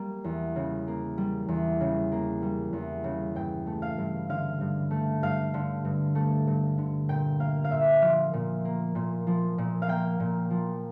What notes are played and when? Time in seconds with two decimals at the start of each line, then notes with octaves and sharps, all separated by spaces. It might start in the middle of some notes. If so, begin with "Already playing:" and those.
Already playing: G3 A#3
0.24 E2
0.56 C#3
0.87 A#3
1.18 G3
1.48 E2
1.81 C#3
2.12 A#3
2.42 G3
2.73 E2
3.04 C#3
3.35 G2 G5
3.67 A3
3.82 F5
3.98 G2
4.29 D3 F5
4.61 G2
4.91 A3
5.23 G2 F5
5.54 D3
5.85 G2
6.15 A3
6.47 G2
6.78 D3
7.09 A#2 G5
7.40 A#3 F5
7.64 F5
7.70 A#2 E5
8.02 F3 F5
8.33 A#2
8.65 A#3
8.95 A#2
9.27 F3
9.58 A#2
9.82 F5
9.88 A#3 G5
10.20 A#2
10.50 F3